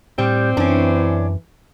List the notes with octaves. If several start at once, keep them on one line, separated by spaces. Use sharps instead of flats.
A2 G3 C4
F#2 E3 C#4 D4